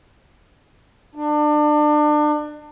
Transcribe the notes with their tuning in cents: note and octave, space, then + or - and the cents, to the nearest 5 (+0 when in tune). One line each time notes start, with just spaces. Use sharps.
D4 +30